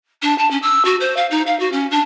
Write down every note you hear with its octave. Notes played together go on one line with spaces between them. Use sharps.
D4
A5
C#4
E6
F#4
C5
F5
D#4
F5
F#4
C#4
D4